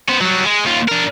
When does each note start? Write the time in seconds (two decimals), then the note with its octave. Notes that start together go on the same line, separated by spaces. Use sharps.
0.09 B3 C5
0.21 F#3 G3
0.46 G#3
0.64 D#2 F4
0.88 D4 A#4